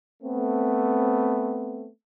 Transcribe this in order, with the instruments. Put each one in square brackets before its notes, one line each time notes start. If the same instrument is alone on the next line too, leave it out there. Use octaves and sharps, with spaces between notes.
[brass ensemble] A3 B3 C4